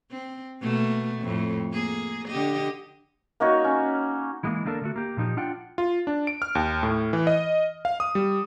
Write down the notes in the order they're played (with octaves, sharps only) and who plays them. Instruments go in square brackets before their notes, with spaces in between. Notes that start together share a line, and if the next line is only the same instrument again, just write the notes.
[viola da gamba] C4
B2 A3 A#3
F2 A2
A#3 G#4
D3 G4 D#5
[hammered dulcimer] A#3 D#4 F#4 C#5
C#4
[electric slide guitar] E3 G#3 A#3
D3 A3 A#3 D4 A4 A#4
D3 A3 F#4
A#3 G4
A#2 F3 D#4 G4
D4 F4 F#5 G5
[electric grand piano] F4
D4
D7
F6
D#2
A2
E3
D#5
F5
D#6
G3